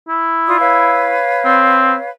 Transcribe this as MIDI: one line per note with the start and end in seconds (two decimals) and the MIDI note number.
0.09 1.20 64
0.47 0.59 65
0.47 0.59 74
0.47 0.59 87
0.59 2.10 71
0.59 2.10 73
0.59 2.10 77
1.45 1.94 60